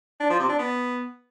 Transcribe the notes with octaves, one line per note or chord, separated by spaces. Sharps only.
D4
F3
C3
D4
B3